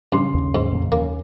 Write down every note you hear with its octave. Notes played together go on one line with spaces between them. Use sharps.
G2 C#3 C6
D#2
G#2
F2 A#2
D#2 A#3 C#4